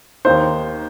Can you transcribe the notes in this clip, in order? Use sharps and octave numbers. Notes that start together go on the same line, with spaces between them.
D#2 D#3 A#3 D#4 C5